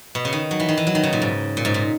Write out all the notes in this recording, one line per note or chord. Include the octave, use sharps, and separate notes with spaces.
B2
C#3
D#3
F#3
E3
D#3
E3
F#3
D#3
C#3
A#2
G#2
A#2
G#2
A#2